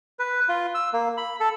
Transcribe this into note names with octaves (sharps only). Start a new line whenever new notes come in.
B4
F4
E6
A#3
B5
A4